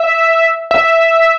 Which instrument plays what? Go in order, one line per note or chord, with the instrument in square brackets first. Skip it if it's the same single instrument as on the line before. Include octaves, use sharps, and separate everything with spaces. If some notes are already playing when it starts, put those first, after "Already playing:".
Already playing: [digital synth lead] E5
E5